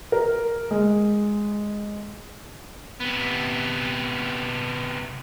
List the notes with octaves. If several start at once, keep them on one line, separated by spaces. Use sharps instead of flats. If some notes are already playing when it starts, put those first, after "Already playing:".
A#4
G#3
C3 B3